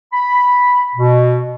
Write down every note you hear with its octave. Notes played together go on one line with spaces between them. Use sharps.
B5
B2